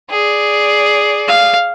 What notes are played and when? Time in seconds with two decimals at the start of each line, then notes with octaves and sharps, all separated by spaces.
0.10 G#4 D5
1.28 F5